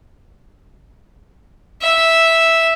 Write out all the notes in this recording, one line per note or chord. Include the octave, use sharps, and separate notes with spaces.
E5